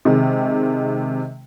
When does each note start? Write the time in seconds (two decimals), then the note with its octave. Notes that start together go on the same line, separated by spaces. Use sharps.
0.05 C3 D#3 G#3